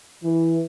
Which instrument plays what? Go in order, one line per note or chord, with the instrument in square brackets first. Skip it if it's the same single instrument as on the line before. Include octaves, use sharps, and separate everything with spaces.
[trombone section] E3